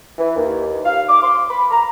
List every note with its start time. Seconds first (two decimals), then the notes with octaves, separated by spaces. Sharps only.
0.18 E3
0.36 D#2
0.85 F5
1.09 D6
1.23 C6
1.50 B5
1.71 A#5